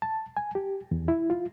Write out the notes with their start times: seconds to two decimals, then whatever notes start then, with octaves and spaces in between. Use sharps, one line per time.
0.02 A5
0.37 G#5
0.55 G4
0.91 E2
1.08 E4
1.30 F4